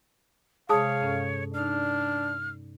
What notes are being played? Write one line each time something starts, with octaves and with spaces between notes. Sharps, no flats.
C3 G#3 G#4 C#5 F5 A5 D#6
G2 C#4 A4
D4 D#4 D5 F6